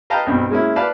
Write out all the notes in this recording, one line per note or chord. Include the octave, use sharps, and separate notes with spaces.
B4 D#5 F5 G5 A5 A#5
B1 G2 C4
G#3 A#3 C#4 E4
B4 D5 F5 A5